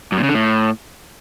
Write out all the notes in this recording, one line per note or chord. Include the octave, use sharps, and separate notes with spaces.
F#2
A#2
C#3
D3
A2